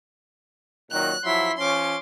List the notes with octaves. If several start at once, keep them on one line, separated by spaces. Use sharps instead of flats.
A#2 D#3 F#3 F#6
F3 F#3 E4 C6 B6
F3 C#4 C6 D6